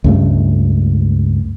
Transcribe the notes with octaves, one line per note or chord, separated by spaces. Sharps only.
C#2 G2 A3